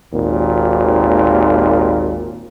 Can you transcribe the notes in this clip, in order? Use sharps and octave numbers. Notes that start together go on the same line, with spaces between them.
G#1 D#2 A#2